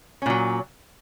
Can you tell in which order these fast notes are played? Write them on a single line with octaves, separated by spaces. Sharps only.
C#4 A#2 F#3